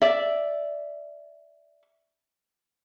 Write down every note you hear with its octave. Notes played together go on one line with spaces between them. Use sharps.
D5 E5